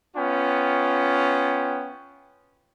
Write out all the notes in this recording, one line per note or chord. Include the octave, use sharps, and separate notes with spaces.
B3 C#4 F4 G5